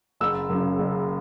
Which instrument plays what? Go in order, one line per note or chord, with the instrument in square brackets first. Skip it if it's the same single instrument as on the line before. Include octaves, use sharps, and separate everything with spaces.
[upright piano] F#1 E6
F#2
C#3
F#1